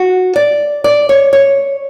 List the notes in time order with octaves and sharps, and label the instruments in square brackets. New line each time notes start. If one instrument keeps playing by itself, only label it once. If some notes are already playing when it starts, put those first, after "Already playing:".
Already playing: [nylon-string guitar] F#4
D5
D5
C#5
C#5